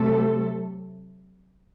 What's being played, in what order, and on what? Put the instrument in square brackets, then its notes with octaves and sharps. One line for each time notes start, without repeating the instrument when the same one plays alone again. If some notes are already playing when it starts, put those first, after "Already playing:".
Already playing: [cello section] C3 F#3 A3 A4